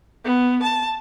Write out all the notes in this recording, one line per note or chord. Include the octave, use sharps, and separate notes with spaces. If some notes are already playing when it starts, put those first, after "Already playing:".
B3
A5